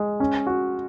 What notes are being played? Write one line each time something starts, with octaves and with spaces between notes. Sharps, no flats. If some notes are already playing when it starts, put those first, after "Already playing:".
Already playing: G#3
C#4
F#4